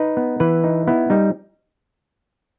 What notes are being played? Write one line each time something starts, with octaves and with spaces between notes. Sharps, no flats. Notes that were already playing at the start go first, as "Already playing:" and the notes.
Already playing: D#4 B4
B3
E3 B4
D#4
B3 E4
G3 D#4